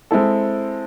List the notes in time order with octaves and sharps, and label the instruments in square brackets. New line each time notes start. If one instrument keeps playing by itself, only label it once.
[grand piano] G#3 C4 E4 A4